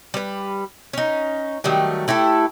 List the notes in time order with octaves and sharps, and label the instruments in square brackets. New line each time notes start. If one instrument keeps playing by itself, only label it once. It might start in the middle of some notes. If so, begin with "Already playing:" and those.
[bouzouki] G3 B4
C#4 D#4
D#3 F#3 G3 A3
A3 E4 G4 A4